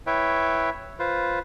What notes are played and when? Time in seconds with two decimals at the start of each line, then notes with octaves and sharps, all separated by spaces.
0.07 E4 B4 C#5 E5 G5
0.99 F4 B4 C5